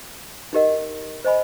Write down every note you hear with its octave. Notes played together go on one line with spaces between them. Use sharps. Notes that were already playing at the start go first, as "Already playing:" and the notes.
D#4 G4 A#4 D#5 F#5
C5 D#5 G#5 B5